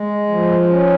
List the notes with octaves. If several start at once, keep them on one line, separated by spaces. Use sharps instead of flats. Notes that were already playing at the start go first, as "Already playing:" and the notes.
Already playing: G#3
F3
C#4